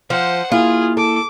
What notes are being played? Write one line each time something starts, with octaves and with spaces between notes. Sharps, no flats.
F3 C5 F#5
A#3 E4 F4 G#4
A4 D6